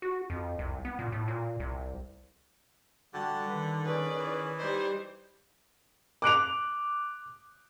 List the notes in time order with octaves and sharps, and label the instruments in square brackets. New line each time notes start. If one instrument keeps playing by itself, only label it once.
[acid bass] F#4
F2
C2
B3
A#2
A2
A#2
C2
[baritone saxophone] D3 [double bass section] G3 [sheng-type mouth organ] F#4 G4 A5
[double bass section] D#3 [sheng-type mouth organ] B4
[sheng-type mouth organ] C#4 G#4 [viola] B4 D5
[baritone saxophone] E3
[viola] G3 C5 [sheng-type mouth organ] D#4 B4 D5
[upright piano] D6 F#6 D7 F7